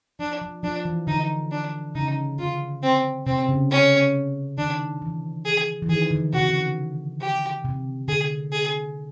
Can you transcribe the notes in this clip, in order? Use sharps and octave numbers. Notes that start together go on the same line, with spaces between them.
F3 D4
F3
F3 D4
E3
D3 D#4
D4
C#3 D#4
D3 F4
C4
C3 C4
C#3
C#4
D#3 D4
E3
G#4
E3
D#3 G#4
D3
C3 F#4
C#3
C3
G4
C3
D3 G#4
G#4